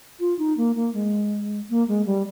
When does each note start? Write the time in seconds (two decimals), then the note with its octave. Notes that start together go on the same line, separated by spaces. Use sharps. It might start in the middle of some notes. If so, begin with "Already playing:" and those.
0.20 F4
0.38 D#4
0.57 A#3
0.75 A#3
0.94 G#3
1.69 A#3
1.88 G#3
2.06 G3